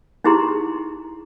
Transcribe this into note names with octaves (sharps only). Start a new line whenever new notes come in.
D#4 E4 G4 G#4 A#5 C6